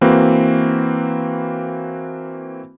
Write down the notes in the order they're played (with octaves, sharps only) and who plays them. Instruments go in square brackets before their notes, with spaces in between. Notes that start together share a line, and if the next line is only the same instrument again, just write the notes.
[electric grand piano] E3 A#3 C4 F#4 B4